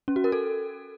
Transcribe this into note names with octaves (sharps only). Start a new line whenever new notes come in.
C#4
F#4
A#4
A4